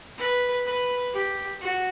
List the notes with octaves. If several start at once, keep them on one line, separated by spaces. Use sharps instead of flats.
B4
B4
G4
F#4